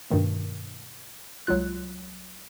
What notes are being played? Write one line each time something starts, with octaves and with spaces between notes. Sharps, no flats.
G2 B2 D#3 A3
C2 F#3 G#3 F4 F#6